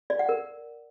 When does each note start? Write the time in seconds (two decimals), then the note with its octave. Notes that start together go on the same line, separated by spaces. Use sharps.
0.10 D5
0.19 F#5
0.29 A#4